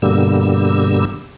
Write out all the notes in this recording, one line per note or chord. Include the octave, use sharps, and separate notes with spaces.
G2 B2 D3 G3 A#3 E6